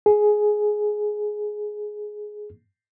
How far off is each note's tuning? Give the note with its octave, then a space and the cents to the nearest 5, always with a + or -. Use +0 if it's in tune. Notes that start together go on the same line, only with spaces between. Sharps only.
G#4 +10